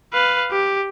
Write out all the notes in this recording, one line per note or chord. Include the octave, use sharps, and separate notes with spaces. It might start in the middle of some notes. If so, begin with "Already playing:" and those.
B4 F5
G4